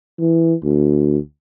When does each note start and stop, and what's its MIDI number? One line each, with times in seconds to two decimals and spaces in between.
0.20 0.54 52
0.64 1.18 38